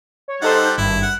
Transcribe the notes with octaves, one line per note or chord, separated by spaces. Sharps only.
C#5
G3 D#4 A4 C5 F#5
G#1 G2 E4
F#5